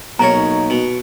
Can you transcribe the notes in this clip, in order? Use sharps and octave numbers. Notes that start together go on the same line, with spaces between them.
B1 A#3 D#4 A#4 C#5 A#5
B2